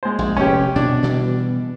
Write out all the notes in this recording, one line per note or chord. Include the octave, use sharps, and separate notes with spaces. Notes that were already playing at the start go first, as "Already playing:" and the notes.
G#3 C5
A#1
F1 C#4 G4
B2 D4
B2 E3 G3